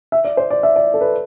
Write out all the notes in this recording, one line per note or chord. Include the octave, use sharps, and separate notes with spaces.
E5
D5
C5
D5
E5
D5
A4
B4